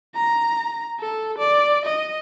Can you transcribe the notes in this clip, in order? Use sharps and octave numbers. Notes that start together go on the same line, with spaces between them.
A#5
A4
D5
D#5